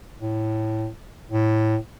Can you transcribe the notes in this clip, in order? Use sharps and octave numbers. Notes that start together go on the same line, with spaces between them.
A2
A2